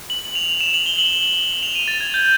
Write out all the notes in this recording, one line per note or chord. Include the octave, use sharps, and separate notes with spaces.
F#7
F7
E7
F#7
G7
F#7
F7
D#7
A6
G#6
G6